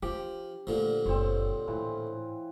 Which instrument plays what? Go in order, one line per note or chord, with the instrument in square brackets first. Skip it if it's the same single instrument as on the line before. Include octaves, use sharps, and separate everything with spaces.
[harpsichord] F3 [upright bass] D4 [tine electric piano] G4
[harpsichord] A#2 D3 F3 [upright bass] A3
[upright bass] F#1 [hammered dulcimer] C4 C#5
[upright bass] A2 [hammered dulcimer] E3 F4